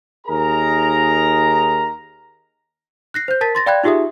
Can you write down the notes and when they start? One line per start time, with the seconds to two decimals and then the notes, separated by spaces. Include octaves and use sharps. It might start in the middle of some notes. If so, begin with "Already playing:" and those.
0.27 D#2 D#4 G#4 A#4 A#5
3.14 F#6 A#6 C7
3.28 C5 G6
3.41 A#4 A5 A6 B6
3.55 C6 A6 A#6
3.66 D5 F5 G5 B5 F#6 G#6
3.84 D#4 F4 G4 G#4 E5 D#6